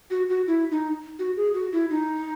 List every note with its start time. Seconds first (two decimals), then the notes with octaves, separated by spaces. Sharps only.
0.11 F#4
0.30 F#4
0.47 E4
0.71 D#4
1.19 F#4
1.37 G#4
1.54 F#4
1.73 E4
1.91 D#4